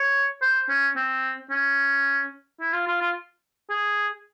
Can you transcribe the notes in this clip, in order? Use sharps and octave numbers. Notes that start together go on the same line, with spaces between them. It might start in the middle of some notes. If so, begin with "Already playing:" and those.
Already playing: C#5
C5
C#4
C4
C#4
E4
F4
F4
F4
G#4